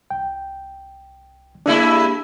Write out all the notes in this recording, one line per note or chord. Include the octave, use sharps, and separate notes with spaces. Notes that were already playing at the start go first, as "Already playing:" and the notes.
C2 G5
G2 G#3 A#3 D4 E4